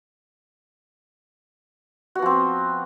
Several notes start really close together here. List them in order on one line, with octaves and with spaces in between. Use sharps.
F#4 B3 F3 C4